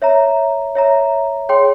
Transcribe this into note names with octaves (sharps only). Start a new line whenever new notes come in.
C#5 E5 A#5
C#5 E5 A#5
G#4 C#5 G5 C6